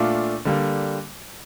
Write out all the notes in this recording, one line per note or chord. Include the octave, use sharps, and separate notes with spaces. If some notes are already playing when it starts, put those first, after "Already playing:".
Already playing: A#2 A3 D4 F4
D3 G3 A#3